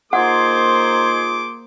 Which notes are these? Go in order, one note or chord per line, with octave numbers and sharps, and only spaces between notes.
A#3 D#4 F4 G#4 C5 F#5 D6